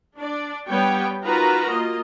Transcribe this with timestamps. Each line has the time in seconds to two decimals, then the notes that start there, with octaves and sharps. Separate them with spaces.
0.17 D4 D5
0.68 G3 B3 C#5 G5
1.23 D#4 F4 F#4 A#4 B4 A#5
1.68 A#3 F4 D#5